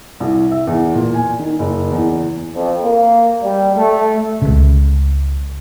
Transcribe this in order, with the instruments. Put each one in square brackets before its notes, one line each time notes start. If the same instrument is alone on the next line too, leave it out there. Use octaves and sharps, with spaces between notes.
[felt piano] C2
E5
E2
A#2
G#5
D#3
F#1
E2
[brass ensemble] F2
A#3
G3
A3
[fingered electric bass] C#2 C#3